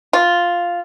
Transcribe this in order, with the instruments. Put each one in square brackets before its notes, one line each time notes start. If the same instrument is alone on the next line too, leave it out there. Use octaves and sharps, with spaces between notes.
[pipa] F4